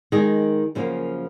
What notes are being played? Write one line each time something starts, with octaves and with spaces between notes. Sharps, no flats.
D#3 G#3 D#4 G#4
F#2 C#3 F3 A#3